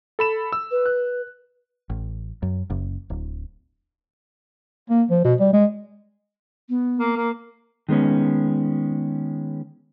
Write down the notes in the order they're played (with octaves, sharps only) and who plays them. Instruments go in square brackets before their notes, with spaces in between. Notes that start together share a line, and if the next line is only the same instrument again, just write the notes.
[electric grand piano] A4 B5 E7
E6
[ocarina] B4
[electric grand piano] F#6
[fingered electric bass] A1
F#2
F#1
D1
[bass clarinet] A#3
F3
B2
G3
G#3
[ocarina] B3
[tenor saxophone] A#3
A#3
[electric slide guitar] D#3 G#3 B3 C#4